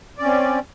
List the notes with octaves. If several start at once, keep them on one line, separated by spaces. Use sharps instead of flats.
C4 C#4 D5